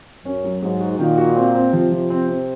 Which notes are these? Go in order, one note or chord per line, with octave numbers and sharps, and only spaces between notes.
F#2 C#4
F#3
G#2 F#3
F#4
A#2 D#3
F#4
C4
C4
C3 F3
F3
C4
C4